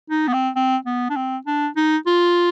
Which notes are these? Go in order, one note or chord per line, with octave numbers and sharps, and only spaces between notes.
D#4
B3
C4
C4
B3
D4
C4
D4
D#4
F4